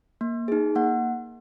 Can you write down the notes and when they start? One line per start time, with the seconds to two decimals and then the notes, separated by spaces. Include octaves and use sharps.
0.21 A#3
0.48 D#4 G#4
0.75 A#3 F#5